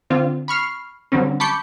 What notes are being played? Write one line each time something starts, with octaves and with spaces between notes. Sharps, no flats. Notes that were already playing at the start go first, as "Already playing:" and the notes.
D3 C4 F4
B5 C#6 F6 C7
D3 F#3 G3 C4 C#4
A5 B5 C#6 D6 G6 C#7